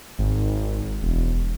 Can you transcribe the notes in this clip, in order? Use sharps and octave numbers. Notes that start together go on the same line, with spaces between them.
G#1
E1